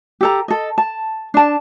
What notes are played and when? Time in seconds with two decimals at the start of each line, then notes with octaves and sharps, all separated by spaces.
0.21 G4 A4 A#5
0.48 A4 D#5
0.78 A5
1.34 D4 A5